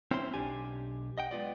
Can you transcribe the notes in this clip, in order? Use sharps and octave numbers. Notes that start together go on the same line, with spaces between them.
C4 C#4 E4 C5 A5 C6
B1 D4 G4 G#5
D#5 F#5 G5
G#3 B3 F4 D5